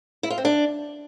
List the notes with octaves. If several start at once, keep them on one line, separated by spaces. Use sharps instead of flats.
E4
F4
C4
D4